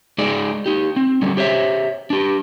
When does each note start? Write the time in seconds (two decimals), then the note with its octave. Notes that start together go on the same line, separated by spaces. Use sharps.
0.18 G#3 D#4 G#4 D5
0.66 D#4 G4
0.96 C4
1.22 D3 G3 C#4
1.37 G4 C5 C#5 E5
2.10 D4 G4